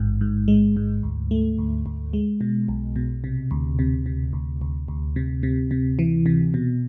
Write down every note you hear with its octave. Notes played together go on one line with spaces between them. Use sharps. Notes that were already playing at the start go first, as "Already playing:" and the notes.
Already playing: A1 G#2
G#2
G#3
G#2
D2
A3
D2
D2
G#3
B2
B1
B2
C3
D2
C3
C3
D2
D2
D2
C3
C3
C3
E3
C3
B2